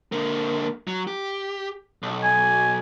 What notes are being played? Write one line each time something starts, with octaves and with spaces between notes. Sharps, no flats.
D3 A#3
F#3
G4
B1
G#5